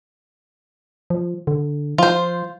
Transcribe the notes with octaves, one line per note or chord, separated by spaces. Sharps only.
F3
D3
F3 F4 C5